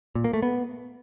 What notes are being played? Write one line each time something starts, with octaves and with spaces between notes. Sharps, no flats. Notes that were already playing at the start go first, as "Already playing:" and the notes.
A#2
A#3
A3
B3